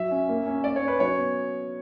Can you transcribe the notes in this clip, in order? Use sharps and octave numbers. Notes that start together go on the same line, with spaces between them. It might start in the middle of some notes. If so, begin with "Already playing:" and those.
Already playing: F#3 E5
C#4
A#3
C#4
A#3 D5
C#5
C#4
B4
F#3 C#5
B3